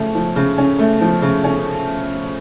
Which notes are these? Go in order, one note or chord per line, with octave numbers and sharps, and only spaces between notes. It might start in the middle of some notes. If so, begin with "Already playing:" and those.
Already playing: C#3 F3 A3 C#4
F3
C#3
C#4
A3
F3
C#3
C#4